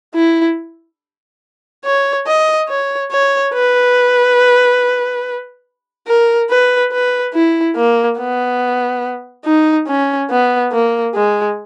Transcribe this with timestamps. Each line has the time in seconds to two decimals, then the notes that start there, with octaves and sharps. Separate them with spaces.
0.15 E4
1.85 C#5
2.27 D#5
2.69 C#5
3.11 C#5
3.54 B4
6.07 A#4
6.50 B4
6.92 B4
7.34 E4
7.76 A#3
8.18 B3
9.45 D#4
9.87 C#4
10.30 B3
10.72 A#3
11.15 G#3